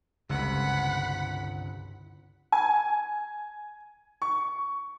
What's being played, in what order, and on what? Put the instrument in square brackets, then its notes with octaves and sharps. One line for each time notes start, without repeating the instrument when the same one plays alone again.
[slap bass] G1 C3 [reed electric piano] C#2 [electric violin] F#5 B5
[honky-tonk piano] G#5
C#6